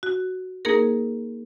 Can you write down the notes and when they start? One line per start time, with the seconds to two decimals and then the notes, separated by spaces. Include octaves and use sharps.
0.03 F#4
0.65 A#3 D#4 G#4 A#4